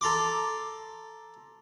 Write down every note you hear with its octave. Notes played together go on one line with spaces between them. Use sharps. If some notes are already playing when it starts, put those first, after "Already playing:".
A4 A#5 C6 D6